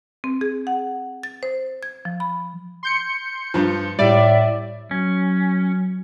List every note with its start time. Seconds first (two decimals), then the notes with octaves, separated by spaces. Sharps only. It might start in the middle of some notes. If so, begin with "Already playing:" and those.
0.24 C4
0.41 G#4
0.67 F#5
1.23 A6
1.43 C5
1.83 G#6
2.05 F3
2.20 B5
2.83 C6 G6 C#7
3.54 G2 F3
3.99 A2 G3 D5 E5
4.91 F#3 C#4